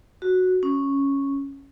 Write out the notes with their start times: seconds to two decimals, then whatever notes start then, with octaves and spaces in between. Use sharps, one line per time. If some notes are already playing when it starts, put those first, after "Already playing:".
0.22 F#4
0.63 C#4